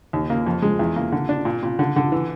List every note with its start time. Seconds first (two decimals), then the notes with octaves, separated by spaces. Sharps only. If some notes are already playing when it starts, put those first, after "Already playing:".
0.13 D#2
0.30 A#3
0.47 F2
0.62 G#3
0.79 E2
0.96 A#3
1.12 D3
1.29 D4
1.45 A#2
1.63 A#2
1.79 D3
1.96 D3
2.12 E3